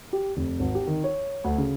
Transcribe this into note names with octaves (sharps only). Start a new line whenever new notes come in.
G4
F1
G#1
G4
D#3
C#5
D2
C#3